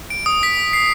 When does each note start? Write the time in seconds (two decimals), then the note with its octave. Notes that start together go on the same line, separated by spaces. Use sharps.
0.10 D7
0.26 D#6
0.43 B6
0.73 C7